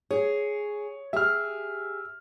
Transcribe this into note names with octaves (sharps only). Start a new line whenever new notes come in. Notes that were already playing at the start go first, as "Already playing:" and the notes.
G#4 C#5
G4 G#4 E5 F6